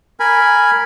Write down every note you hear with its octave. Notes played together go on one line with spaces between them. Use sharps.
A#4 G#5 B5